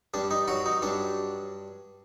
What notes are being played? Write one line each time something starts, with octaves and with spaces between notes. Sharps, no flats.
G2 D4
D#4
F#3 F#4
D#4
G2 D4